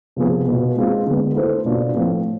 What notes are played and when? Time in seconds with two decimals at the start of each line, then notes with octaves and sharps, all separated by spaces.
0.16 C3 F3 B3 F4 G#4
0.47 B2 B3 F4 B4
0.76 G#3 C4 F4 G#4
1.06 D3 G#3 B3
1.35 A3 E4 A4 C5
1.65 B2 B3 D4 F4
1.94 A2 F3 A3 C4